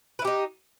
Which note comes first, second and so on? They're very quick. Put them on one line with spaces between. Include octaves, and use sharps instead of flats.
B4 E4 G4 D#4